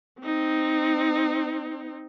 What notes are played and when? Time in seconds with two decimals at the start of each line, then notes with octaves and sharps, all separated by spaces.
0.22 C4 D#4